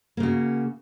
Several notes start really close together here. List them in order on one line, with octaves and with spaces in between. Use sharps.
A#3 C#3 F#4